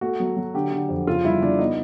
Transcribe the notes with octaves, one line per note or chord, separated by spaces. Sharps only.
A3 F#4
F#3
F#3
D3 G4
D3
F2
C#3 F4
G3 E4
C#3 D4
B3 D#4